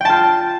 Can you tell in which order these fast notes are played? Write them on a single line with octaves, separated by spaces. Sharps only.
G5 A5 F4